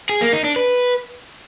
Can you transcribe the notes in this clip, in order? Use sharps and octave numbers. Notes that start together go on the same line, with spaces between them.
G#4
A#3
D#4
D4
B4